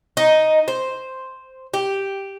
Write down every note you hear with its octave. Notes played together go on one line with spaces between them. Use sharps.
D#4
C5
G4